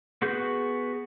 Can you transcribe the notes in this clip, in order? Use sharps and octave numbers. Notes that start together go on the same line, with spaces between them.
B3 F#4 G#4 G6